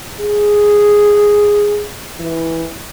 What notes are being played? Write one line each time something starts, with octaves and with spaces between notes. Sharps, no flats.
G#4
E3